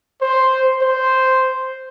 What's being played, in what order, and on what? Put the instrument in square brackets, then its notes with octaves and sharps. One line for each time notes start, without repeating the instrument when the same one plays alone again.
[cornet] C5
C5